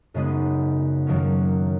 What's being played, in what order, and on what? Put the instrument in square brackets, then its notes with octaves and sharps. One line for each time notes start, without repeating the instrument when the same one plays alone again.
[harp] F#2 C#3 G#3 B3 D#4
F#2 D#3 F#3 A#3 C#4